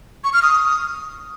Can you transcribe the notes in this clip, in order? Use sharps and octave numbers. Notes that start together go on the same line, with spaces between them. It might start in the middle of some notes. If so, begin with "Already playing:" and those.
C#6
F6
D#6